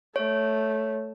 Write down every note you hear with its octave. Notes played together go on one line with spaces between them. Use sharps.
A3 C#5